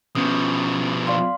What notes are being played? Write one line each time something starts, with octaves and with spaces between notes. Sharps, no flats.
B2 F3 B3 C#4 D#6
D5 F5 C6